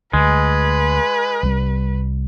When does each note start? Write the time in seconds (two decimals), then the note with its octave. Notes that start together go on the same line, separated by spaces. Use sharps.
0.13 D2 G#3 B4
1.43 C2 G3